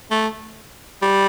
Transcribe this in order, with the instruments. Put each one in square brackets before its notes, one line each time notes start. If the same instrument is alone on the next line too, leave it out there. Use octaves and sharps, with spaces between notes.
[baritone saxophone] A3
G3